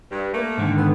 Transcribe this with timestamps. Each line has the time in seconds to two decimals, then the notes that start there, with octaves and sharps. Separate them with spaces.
0.11 G2
0.34 A3 A#3
0.58 G#2 D3 D#3
0.77 B3